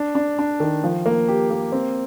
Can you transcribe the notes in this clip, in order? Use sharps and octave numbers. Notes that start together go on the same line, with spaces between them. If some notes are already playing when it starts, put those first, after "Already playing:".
Already playing: D4
D4
D4
D#3
F3
A#3
G4
A#3
C4